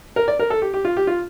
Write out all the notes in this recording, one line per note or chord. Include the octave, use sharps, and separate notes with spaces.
A#4
D5
A#4
A4
G4
G4
F4
G4
F4